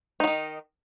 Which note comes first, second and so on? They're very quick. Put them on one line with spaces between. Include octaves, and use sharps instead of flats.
D#4 F#3 D#3